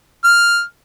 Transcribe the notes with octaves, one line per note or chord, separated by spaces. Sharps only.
F6